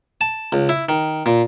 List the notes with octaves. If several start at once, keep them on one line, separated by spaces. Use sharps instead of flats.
A5
C#2
E4
D#3
A#2